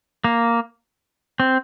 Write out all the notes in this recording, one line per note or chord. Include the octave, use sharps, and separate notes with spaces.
A#3
C4